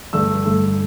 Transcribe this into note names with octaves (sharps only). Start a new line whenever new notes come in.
G2 D3 A3 E6
G2 D3 A3